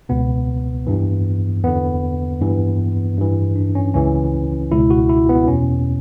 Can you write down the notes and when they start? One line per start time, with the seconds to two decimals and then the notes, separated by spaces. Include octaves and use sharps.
0.09 C#2 B2 B3
0.87 G2 E3
1.64 E2 D3 B3
2.41 G2 E3
3.17 G2 E3
3.56 D4
3.75 C#4
3.94 C#2 C#3 E3 C#4
4.72 C#2 B2 E4
4.90 F#4
5.09 E4
5.29 B3
5.48 E2 B2 C#4